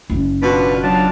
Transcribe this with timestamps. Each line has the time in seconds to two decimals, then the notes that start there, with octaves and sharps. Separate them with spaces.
0.10 F#1
0.43 B2 D4 F4 B4
0.84 F#3 D4 F4 A5